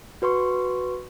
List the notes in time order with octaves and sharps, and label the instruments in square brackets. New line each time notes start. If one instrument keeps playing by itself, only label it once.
[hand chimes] F#4 B4 C6 C#6